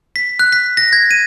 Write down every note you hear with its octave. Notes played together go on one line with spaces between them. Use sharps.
B6
F#6
B6
A#6
G#6
D#7